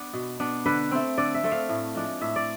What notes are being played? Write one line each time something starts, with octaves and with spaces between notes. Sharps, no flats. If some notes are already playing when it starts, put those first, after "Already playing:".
Already playing: B3 D4
B2
B3 D4
D3 B4
A3 C4 C5
D3 D5
E5
A3 C4
F5
A2
F3 G#3 D4
A2 E5
D5